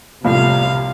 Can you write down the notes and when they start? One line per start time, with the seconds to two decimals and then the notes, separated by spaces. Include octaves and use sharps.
0.24 C2 A2 C3 F3 F5